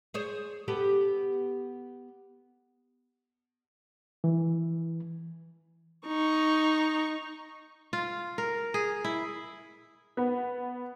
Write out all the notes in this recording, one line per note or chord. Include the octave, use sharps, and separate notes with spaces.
G#4 C5 C#5
B3 G4 A4
E3
D#4 C#6
F4
A#4
G#4
E4
B3